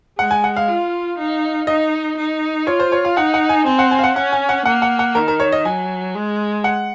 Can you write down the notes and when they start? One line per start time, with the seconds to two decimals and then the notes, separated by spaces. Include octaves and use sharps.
0.18 G#3 F#5
0.31 G#5
0.44 F#5
0.57 F5
0.68 F4
1.18 D#4
1.67 D#4 D#5
2.17 D#4
2.66 F4 C#5
2.80 C5
2.92 C#5
3.05 F5
3.16 D#4 F#5
3.34 F#5
3.49 G#5
3.66 C4 G#5
3.79 F#5
3.91 G#5
3.99 F5
4.04 F#5
4.16 C#4 F#5
4.32 G#5
4.49 F#5
4.66 A#3 F#5
4.82 F#5
4.99 F#5
5.15 D#3 A#4
5.28 A#4
5.40 C#5
5.52 D#5
5.65 F#3 G#5
6.15 G#3
6.64 F#5